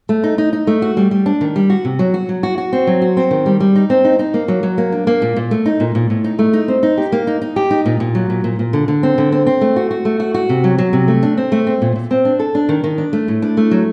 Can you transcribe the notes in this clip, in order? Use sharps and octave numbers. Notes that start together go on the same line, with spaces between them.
A3
D#4
D#4
D#4
A3
F#4
G3
G3
D4
D#3
G3
F#4
C3
F#3
F#4
F#3
F#4
F#4
C4
F#3
F#4
C4
D#3
G3
G3
D#4
C4
D#4
D#4
A#3
F#3
F#3
A#3
D4
A#3
A#2
A#2
A3
D#4
A#2
A#2
A2
D#4
A3
D#4
C4
D#4
G4
A#3
D#4
D#4
G4
D#4
A#2
A#2
F#3
A#2
A#2
A#2
D3
D3
C4
D3
C4
C4
A3
F#4
F#4
A3
F#4
F#4
C3
F#3
F#3
C3
A3
D4
C4
A3
C4
A#2
A#2
C4
D4
A4
D4
D#3
D#3
D4
A3
A2
D4
A3
F#3